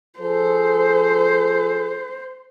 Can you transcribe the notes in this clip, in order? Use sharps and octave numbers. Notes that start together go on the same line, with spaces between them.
F3 G#4 A4 C5